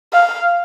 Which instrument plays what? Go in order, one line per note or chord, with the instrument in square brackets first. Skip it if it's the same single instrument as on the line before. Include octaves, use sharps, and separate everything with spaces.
[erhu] F5